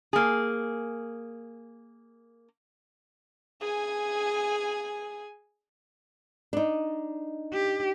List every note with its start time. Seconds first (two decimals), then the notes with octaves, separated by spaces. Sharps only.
0.13 A#3 G#4
3.61 G#4 G#5
6.53 D4 D#4
7.53 G4